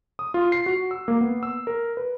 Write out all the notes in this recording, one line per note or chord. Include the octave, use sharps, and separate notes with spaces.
D#6
F4
C7
F#4
E6
A#3
B3
E6
A#4
B4